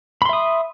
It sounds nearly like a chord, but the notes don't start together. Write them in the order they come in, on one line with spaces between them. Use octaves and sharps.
B5 C6 E5 D#6